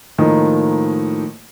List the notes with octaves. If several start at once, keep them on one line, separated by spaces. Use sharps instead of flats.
A2 D#3 F3 A#3